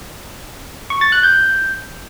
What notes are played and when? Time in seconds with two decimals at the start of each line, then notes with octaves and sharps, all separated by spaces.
0.90 C#6
1.01 A6
1.12 F#6
1.23 G6